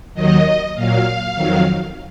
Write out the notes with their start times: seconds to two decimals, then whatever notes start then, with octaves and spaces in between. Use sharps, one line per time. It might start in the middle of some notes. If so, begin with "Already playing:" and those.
0.14 D#2 D#3 F#3 D#5
0.75 A#2 F#3 F5
1.35 F2 D#3 F#3